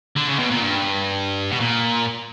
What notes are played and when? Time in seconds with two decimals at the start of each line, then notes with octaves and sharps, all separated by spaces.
0.17 D3
0.27 C#3
0.39 B2
0.51 A#2
0.61 G2
1.51 B2
1.60 A#2